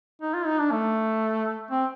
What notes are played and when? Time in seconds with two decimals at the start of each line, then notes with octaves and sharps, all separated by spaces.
0.22 D#4
0.34 F4
0.46 D#4
0.59 D4
0.72 A3
1.71 C4